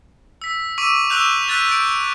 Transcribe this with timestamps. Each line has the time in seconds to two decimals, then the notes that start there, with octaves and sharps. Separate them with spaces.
0.42 E6 B6
0.78 C#6 D6 E6 B6 D#7
1.10 C#6 D6 E6 F#6 G6 F7
1.47 F#6 G6 A6 B6 D#7
1.69 G6 D7